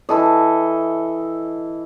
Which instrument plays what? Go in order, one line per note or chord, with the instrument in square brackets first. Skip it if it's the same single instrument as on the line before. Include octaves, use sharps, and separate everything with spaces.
[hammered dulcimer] E3 A4 D#5